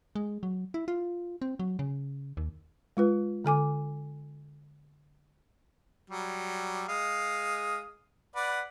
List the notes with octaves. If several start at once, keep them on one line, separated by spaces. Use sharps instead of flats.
G#3
F#3
E4
F4
C4
F#3
C#3
D#2
G#3 F4 B4
D3 A4 G#5 D6
F#3 G3
G#3 F5 D#6
B4 D5 F#5